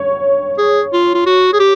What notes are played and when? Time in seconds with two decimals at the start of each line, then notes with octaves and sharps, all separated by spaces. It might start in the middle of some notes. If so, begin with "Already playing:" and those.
Already playing: C#5
0.58 G#4
0.93 F4
1.14 F4
1.26 F#4
1.53 G#4
1.60 G4